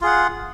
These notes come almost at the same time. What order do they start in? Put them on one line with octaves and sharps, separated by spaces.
F4 G#4 F#5